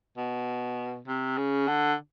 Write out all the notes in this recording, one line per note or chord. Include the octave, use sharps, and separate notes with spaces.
B2
C3
C#3
D3